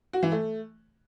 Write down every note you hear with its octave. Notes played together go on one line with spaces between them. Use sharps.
F#4
E3
A3